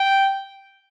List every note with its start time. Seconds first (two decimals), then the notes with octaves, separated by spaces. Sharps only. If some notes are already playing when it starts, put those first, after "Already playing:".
Already playing: G5